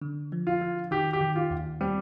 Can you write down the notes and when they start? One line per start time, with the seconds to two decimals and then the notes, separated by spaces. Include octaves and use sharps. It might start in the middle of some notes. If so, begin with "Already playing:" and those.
0.01 D3
0.32 F3
0.47 F4
0.61 F3
0.91 D#3 G4
1.13 G4
1.21 D#3
1.36 F4
1.51 D#2
1.81 G3 C4